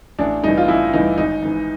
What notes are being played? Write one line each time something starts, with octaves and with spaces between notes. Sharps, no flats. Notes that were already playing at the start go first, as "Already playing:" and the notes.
A1 D4
G2 E3 D#4
F4
A1 E4
G2 E3 D#4
G#1 D#4
G#2 E3